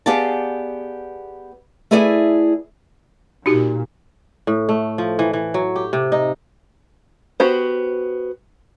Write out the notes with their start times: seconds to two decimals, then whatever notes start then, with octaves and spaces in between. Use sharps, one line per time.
0.06 B3 G4 G#4 D5 F5 A5
1.91 A3 E4 G#4 B4 D5 E5
3.46 A#2 D#4 F#4 G4
4.47 A2
4.69 A3
4.98 F3
5.19 E3
5.33 E3
5.54 F#3
5.76 G4
5.93 C3
6.12 D#4
7.40 B3 F#4 G4 C5